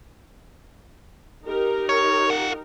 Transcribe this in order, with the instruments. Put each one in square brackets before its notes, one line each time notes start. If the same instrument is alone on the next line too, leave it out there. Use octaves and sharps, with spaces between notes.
[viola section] D#4 G4 A#4
[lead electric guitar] C#5
F4 F#5